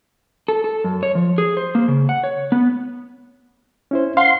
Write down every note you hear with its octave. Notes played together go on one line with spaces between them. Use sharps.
A4
A4
F#2
C#5
F3
G#4
C5
A#3
C#3
F#5
C#5
B3
C#4 E4 C5
F5 F#5 C6